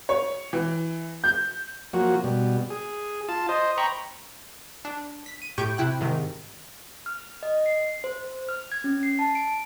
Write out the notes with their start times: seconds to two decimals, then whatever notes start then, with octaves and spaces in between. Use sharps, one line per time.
0.09 C#5
0.53 E3
1.24 G6
1.93 F3 F#3 A#3 F#4
2.24 B2 G3
2.70 G#4
3.29 F4 A5
3.49 C5 D#5
3.78 C5 G5 A#5 B5 C#6
4.85 D4
5.26 B6
5.42 D#7
5.58 A2 G4 C#6 G6 D7
5.77 C3 E4 G5 F#6
6.01 G#2 C3 D#3
7.06 F6
7.43 D#5
7.66 C7
8.04 C5
8.49 F6
8.72 G#6
8.84 C#4
9.03 C7
9.19 A5
9.35 D7